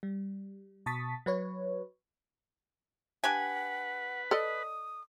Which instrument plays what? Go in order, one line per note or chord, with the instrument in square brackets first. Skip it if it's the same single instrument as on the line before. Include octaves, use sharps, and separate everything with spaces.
[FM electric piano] G3
B2 A5 C#6 D#6 A6 B6
F#3 B4 C#5
[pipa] D4 G4 G#5 [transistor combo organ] B4 [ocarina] F#5
[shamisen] A4 D5 D#5 [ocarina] D#6